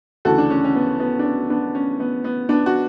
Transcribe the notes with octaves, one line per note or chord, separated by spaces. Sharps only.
D2 C#3 E3 F#4 A4
D4
C#4
C#4
B3
B3
D4
C#4
B3 D4
C#4
B3
B3
B3 D4
F#4